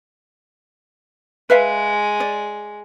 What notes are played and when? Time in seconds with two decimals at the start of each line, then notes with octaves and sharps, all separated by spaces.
1.50 G#3 B4 E5 F5
2.20 D5